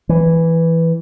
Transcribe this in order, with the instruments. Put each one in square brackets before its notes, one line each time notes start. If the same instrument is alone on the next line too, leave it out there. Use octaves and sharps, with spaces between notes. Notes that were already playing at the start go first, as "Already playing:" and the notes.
[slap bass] E3